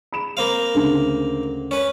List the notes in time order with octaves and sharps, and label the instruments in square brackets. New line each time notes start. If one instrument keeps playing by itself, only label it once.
[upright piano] B5 E7
[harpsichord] A#3 C4 F5
[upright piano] D2 C#3
[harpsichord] C#4 B4